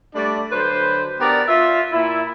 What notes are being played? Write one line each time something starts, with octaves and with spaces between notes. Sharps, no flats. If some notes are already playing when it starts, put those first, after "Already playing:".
G3 A3 D4 D5
D3 F#3 B4 C5
B3 D4 G4 A#4 D5
F4 E5
A#2 E4